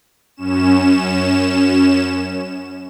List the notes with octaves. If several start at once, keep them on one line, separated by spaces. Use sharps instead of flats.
F#2 C#4 E7